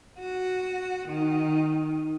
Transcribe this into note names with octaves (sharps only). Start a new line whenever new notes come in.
F#4
D#3